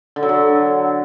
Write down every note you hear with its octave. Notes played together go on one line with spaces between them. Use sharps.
D3
F#3
D3